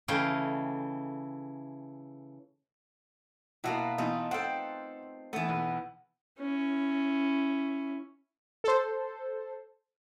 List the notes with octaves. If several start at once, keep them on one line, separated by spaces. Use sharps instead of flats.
C#3 E3 A3 D#5 F5 G5
B2 A3 A#3 E4 F#4
B2 E3 A3 D#4 F4
C4 A4 F#5 G5
E3 A3 B3
B1
C#4 E4
A4 C5